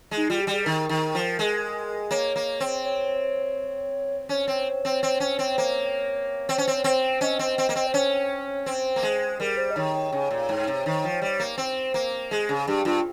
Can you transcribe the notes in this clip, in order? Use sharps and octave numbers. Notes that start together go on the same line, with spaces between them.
G#3
D#4
G3 F4
G4
G3
G#4
D#3 A#4
D#3
F3
G#3
A#3 C#5
A#3
C4
C#5
C#4 C#5
C4
C4
C4
C#4
C4
A#3
C4
C#4
C4
C4
C#4 D#5
C4
C4
A#3
C4
C5
C#4 C#5
C4 C5
A#3
G#3
G3 A#4
C5
D#5
D#3 C#5
C#5
C#3 C#5
A#2
G#2
C3
D#3
F3
G3
A#3
C4
A#3
G#3 G#4
C#3 G#4
G2 G4
G2 F4